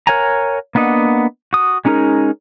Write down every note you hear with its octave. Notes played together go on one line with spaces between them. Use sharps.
A#4 C#5 F#5 G#5 A#5
A#3 B3 D4 D#5 F#5
F#4 D#6
G#3 C#4 D#4 G#4 A#4